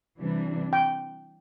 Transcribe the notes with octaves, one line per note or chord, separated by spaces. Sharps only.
C3 E3 G3 D4
G5